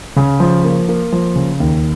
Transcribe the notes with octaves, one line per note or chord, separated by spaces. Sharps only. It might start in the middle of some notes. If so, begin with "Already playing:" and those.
C#3
F3
A#3
A#3
F3
C#3
D#2